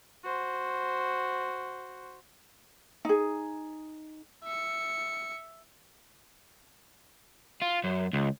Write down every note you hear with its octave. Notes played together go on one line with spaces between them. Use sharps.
F#4 C5
D#4 G#4
E5 C#7
F4
F#2
C#2